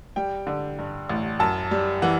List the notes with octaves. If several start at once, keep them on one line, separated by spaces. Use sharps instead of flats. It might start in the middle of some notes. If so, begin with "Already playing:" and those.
G3 G5
D3
G2
A1
F#2 A5
G3
E3 F#5